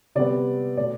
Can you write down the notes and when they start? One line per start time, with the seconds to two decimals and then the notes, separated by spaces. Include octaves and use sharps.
0.15 C3 G3 B3 D5
0.77 B2 A3 D5